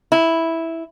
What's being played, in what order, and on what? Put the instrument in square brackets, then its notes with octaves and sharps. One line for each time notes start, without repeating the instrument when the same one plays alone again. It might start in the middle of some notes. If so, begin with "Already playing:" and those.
[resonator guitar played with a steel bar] E4